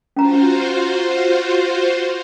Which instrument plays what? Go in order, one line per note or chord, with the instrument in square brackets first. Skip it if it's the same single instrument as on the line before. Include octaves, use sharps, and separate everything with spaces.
[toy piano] C#4 A#5 [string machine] F4 F#4 C5